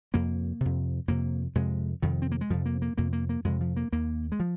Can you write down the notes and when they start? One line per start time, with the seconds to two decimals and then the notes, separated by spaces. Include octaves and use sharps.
0.14 F2 C3 A#3
0.61 F2 C3
1.08 F2 C3 A#3
1.55 F2 C3 G#3
2.02 F2 C3 D#3
2.22 C4
2.32 A#3
2.41 G#3
2.50 F2 C3 F3
2.66 A#3
2.82 A#3
2.98 F2 C3 A#3
3.13 A#3
3.29 A#3
3.45 F2 C3 G#3
3.61 F3
3.77 A#3
3.92 D#2 A#3
4.32 G#3
4.40 F3